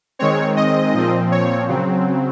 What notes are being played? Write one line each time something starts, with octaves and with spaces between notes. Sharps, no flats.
D#3 G#3 C4 C#5
D#5
A#2 F3 C4
C#5
C#3 F#3 C4